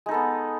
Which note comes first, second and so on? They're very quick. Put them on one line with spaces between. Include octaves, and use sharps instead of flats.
G#3 D#4 A4 B3